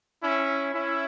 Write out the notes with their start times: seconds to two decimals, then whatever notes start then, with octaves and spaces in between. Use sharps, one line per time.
0.22 C#4 E4
0.73 C#4 E4